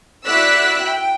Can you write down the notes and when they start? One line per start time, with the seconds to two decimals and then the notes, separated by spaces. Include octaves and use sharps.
0.25 E4 F#4 D5 E6 F#6 B6
0.81 G5